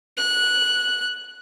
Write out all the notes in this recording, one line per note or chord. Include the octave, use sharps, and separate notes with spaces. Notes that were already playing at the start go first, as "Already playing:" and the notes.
F#6